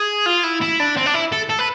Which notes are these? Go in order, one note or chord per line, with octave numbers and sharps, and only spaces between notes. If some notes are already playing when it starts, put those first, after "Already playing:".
Already playing: G#4
F4
E4
E4
D4
C4
D4
E4
A4
A4
B4